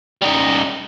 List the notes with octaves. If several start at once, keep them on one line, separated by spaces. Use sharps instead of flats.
G3 D#4